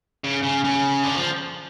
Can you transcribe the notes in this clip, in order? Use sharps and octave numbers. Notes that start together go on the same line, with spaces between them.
C#3
C#3
C#3
D3
F3